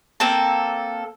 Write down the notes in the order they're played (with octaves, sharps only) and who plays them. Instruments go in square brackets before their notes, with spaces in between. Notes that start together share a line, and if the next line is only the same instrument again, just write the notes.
[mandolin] A#3 C4 A4